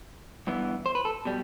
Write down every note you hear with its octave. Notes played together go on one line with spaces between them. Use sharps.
G2 E3 B3
C5
B4
A4
B2 G3